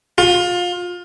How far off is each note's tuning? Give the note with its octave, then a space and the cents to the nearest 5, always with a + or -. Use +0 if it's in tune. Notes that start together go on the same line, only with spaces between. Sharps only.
F4 +25